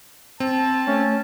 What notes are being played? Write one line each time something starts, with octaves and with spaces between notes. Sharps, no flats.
C4 A5
A3 C#4